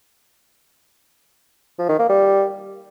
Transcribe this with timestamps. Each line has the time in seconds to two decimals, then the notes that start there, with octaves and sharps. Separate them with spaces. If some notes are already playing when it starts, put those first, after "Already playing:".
1.78 F3
1.89 D#3
1.99 A#3
2.09 G3